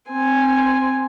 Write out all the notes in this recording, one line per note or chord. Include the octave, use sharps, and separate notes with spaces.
C4 G#5